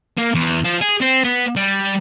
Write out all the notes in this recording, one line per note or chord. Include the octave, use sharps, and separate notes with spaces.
A#3
E2
F3
G#4
C4
B3
G3